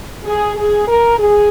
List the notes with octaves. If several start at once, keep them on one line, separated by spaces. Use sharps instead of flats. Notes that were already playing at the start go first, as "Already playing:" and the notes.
G#4
G#4
A#4
G#4